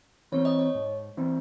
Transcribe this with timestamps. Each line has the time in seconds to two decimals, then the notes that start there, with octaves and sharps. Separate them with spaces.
0.32 E3 C4 C#5
0.45 D#5
0.59 C#5
0.75 G#2
1.17 E3 C4